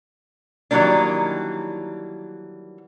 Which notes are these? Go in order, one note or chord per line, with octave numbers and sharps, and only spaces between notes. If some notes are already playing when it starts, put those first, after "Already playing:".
D#3 E3 F#3 G3 A#3 D4